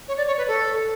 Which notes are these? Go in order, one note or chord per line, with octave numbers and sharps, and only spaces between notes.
C#5
D5
C#5
B4
A4